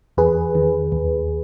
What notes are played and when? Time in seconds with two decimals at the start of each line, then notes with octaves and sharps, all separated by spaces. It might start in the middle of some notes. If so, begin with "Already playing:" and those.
0.17 E2 G#4 B4
0.55 D#3
0.92 D#2